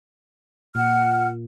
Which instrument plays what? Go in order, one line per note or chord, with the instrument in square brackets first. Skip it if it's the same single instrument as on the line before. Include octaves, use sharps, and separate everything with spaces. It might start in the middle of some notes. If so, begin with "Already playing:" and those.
[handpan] A#2 [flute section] F#5 F6